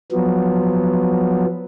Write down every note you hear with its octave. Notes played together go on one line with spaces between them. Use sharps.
F3 F#3 B3